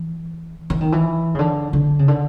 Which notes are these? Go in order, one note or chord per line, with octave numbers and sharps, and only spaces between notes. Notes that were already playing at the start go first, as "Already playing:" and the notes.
Already playing: E3
E3
D#3
E3
C#3
D3
D3
C#3
D3